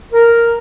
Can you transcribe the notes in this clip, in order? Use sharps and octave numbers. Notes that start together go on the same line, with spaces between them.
A#4